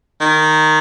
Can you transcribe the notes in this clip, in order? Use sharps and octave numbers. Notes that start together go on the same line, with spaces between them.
D#3